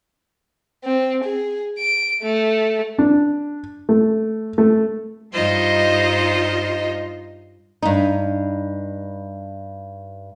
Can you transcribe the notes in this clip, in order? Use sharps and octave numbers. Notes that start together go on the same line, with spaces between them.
C4
G#4
D7
A3
D4
A3
A3
G2 G3 D#4 F4 C5 D#5
G2 D#4